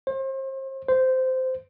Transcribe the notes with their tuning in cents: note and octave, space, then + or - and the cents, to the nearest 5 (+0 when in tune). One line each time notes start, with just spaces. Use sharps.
C5 +35
C5 -15